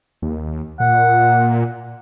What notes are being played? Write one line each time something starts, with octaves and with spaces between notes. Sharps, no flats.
D#2
A#2 F#5